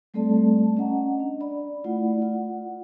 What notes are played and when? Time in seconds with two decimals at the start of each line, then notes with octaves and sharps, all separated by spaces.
0.14 G3 A3 C4 A4 D5 A5
0.77 C#4 D#5 F#5 A#5
1.20 D4
1.41 D5 B5
1.84 A3 E4 F4 D5 F#5
2.22 F4 F#5